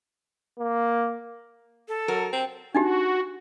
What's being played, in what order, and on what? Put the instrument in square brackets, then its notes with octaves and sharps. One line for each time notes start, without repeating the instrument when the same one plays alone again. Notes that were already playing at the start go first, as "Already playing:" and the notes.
[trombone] A#3
[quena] A4
[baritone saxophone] F#3 [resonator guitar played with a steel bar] A#4
[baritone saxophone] C4
[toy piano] D4 D#4 G4 [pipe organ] F#4